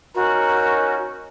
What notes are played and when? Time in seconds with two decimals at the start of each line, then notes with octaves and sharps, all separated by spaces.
0.15 C#4 D#4 F#4 A#4